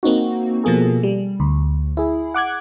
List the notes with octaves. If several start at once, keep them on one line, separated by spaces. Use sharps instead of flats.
A#3 C4 D#4 F#4
B2 F3 A#3 G#4 A4
G3
D2
E4 G#4
F#5 D6 F#6 G#6